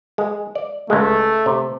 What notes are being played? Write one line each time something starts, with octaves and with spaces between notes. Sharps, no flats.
G#3
D5
C#2 G#3 A3
C3